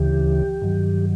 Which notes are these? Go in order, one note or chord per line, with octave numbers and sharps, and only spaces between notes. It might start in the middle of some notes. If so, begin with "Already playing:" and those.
Already playing: D2 C#3 E3 G4
G2 D#3 F#3